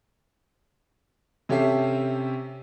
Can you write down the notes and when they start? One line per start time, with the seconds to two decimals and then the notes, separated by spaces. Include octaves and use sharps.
1.49 C3 C#4 G4 A4 E5 C7